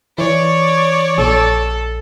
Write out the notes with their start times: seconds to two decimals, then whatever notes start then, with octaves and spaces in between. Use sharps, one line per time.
0.18 E3 C#5 D5
1.18 A#1 A4